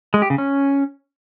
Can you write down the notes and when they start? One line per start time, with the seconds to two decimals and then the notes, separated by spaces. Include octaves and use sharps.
0.14 G#3
0.22 G4
0.30 C#3
0.38 C#4